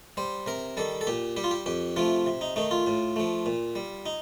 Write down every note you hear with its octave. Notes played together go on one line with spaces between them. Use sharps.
G3 C5
C3 A#4
D#3 G3 A4
A4
A#2 G4
G3 G4
F4
G4
F2 G4
C3 F3 A3 F4
C3
D#4
D#3 A3 D#4
F4
A2
F3 A3
A#2
G3
D#4